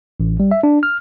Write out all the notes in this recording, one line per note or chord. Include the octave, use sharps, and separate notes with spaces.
A1
G3
E5
D4
F6